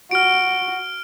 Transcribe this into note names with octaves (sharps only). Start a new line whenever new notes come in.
F#4 F6 D7